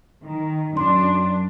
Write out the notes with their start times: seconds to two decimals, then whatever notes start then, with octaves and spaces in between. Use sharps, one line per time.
0.24 D#3
0.77 F#2 D4 C6